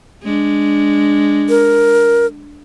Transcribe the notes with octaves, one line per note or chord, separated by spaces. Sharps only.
G#3 D4
A#4